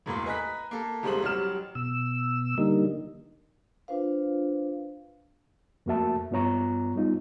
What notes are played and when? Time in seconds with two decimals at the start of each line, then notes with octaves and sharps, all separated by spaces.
0.06 E1 A2 A#3 C6
0.26 B4 D#5 G#5 A#5 F#6 B6
0.71 A#3 A4
1.03 D#1 C2 G#3 C5 F#7
1.23 A1 F#3 G3 F6 E7
1.75 B2 E6
2.58 D3 G3 A#3 D#4
3.88 D4 F4 B4 C5 F5
5.86 F2 A3 A#3 F#4 E5 A5
6.31 G2 B3 F4 C#5 A#5 C#6
6.95 G3 B3 D#4 F4